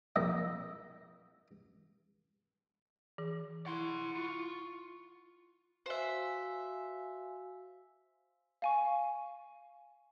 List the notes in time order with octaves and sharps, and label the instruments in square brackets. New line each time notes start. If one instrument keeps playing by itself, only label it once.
[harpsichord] A#1 F2 A#3 D#5 E5
[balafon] E3 G#4
[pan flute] E4 [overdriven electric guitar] F#5 C6 [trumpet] C#6
[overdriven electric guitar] F4
[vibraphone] F#4 F5 G#5 [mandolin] C5 E5
[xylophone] F5 G#5 C#6